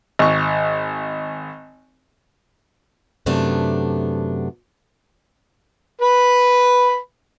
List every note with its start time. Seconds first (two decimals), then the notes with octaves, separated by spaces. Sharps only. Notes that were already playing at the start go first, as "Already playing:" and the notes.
0.19 G#1 C#6
3.26 F#2 C3 A3 B3 D4
6.02 B4 B5